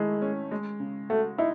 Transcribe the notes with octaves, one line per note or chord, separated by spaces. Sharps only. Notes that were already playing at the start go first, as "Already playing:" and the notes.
Already playing: D#3 G#3 A3 E4
C#4
G#3
C#3
A3 F#4
D#4 E4